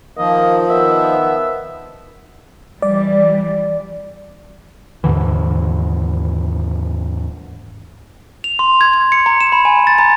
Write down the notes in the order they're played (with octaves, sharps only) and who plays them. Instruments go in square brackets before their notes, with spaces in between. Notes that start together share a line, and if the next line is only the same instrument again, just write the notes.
[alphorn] D#3 [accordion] F3 [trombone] A#3 [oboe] D#5
[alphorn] D#3 [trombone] B3 [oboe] E5
[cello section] E3 G3 [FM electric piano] D5
[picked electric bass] D#2 G#2 D3 E3
[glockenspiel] F7
C6
G#6
G#6
C#7
A#5
E7
B5
G#5
A6
A#5